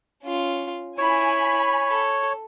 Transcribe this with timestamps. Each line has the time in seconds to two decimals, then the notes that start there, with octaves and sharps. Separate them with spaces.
0.23 C#4 F4
0.98 E4 C#5 G#5 B5
1.90 A4